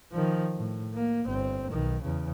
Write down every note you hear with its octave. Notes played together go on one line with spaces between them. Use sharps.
D#3 F3
A2
A#3
G1 C4
B1 D#3
E2 C#3